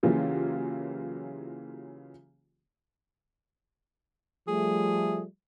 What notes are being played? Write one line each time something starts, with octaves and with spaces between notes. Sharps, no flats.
C#3 E3 F#3 A#3 F4 G4
F3 G3 A3 G#4